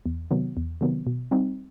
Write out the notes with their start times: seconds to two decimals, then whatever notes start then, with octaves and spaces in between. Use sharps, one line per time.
0.06 E2
0.31 C3 D#3 F#3 B3
0.57 E2
0.81 C3 D#3 F#3 B3
1.07 B2
1.31 G3 C4 D#4